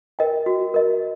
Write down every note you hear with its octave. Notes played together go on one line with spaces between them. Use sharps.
A#4 D#5 G5
F#4
A#4 D#5